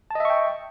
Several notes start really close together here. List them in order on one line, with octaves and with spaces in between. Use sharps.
A5 D#5 E5 C#6 G5